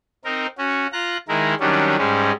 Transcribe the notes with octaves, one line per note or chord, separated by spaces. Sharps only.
C4 D#4 A#4
C#4 F#4
F4 A#5 F#6
D#3 G#3 E4 A#4
D#3 F#3 G3 C#4 D4
G#2 G3 G#3 C#4